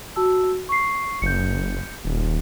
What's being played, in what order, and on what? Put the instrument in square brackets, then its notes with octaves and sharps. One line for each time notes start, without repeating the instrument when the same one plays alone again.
[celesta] F#4 A5 E6
C#6 C7
[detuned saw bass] F#1 [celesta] G6 C#7
[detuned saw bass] D#1